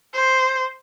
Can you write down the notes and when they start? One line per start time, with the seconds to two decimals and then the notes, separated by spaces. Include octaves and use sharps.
0.14 C5